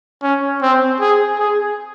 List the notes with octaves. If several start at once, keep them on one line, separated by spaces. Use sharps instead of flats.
C#4
C4
G#4
G#4